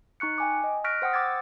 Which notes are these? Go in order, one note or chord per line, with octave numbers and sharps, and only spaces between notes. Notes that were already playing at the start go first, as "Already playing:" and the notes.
D#4 C#6 F#6 C#7
G5 G#5 D6
D#5
C#6 F6 F#6 A#6 B6 D7
C5 F#5 G5 D#6
D6 E6 G#6 A6